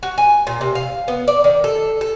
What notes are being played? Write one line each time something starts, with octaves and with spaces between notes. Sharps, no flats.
F#4
G#5
A#2
C3
F5
B3
D5
D#3
A4
A4